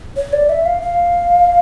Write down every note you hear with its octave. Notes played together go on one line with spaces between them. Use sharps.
C#5
D5
E5
F5
F5